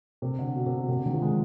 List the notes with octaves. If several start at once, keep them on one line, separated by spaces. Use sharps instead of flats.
C3
D3
B2
C3
B2
C3
D3
D#3
F3
G#3